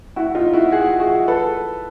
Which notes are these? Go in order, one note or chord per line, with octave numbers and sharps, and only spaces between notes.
E4 F#4
D#4 F4
E4 F#4
F#4 G#4
F#4 G#4
A4 B4